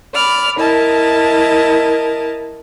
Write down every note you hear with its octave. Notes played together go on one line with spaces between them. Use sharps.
D5 B5 F6
E4 A#4 D#5 A5